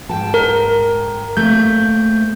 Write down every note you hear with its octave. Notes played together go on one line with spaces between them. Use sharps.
G#2 G5 A5
A#4
A3 A#3 C4 G6